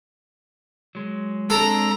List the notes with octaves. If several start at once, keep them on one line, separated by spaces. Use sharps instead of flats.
F#3 G#3
G#3 C4 D4 A4 A#5